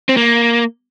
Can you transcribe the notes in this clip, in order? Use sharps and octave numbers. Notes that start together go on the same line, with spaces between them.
C4
A#3